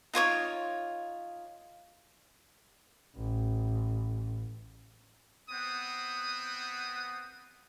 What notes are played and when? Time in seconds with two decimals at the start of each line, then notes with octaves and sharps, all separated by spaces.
0.14 D#4 F4 C#5 D6
3.17 A1
5.50 B3 C4 F#5 D#6